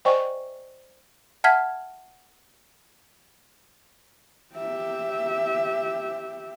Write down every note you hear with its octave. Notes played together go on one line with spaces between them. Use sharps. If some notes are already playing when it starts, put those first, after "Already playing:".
C5 D5 D#5 G5 G#5 C#6
E5 F#5 A5 F6 G#6 B6
G4 E5